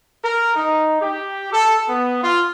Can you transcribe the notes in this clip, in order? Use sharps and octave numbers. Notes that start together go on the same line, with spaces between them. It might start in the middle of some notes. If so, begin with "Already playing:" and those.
A#4
D#4
G4
A4
B3
F4